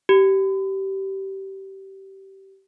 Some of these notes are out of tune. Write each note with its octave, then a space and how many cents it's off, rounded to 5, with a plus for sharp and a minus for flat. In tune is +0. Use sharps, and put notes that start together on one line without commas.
G4 -25